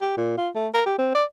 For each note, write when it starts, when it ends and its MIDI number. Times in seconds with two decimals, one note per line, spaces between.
0.01 0.14 67
0.17 0.36 46
0.38 0.49 65
0.55 0.68 57
0.74 0.83 70
0.86 0.96 67
0.98 1.13 60
1.15 1.24 74